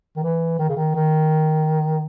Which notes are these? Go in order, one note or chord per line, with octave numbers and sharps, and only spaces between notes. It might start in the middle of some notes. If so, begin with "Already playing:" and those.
D#3
E3
D#3
C#3
D#3
D#3